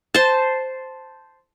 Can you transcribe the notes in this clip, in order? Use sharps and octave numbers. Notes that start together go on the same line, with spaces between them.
C5 A5